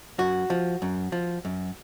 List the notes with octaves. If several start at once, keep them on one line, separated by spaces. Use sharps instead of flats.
F#2 F#4
F3
F#2
F3
F#2